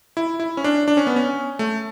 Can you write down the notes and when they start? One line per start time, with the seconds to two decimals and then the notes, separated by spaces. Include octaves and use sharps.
0.17 E4
0.40 E4
0.57 C#4
0.64 D4
0.88 D4
0.97 C#4
1.07 B3
1.16 C#4
1.59 A3